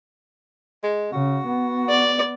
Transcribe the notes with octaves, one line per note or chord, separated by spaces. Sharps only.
G#3
C#3 F#4
B3
D5